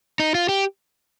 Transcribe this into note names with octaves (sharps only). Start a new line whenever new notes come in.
D#4
F4
G4